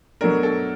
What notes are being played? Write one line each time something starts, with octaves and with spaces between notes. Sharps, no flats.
B2 F#3 A3 D4 A#4
A4